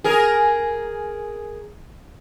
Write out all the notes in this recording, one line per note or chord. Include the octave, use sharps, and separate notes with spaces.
G#4 A#4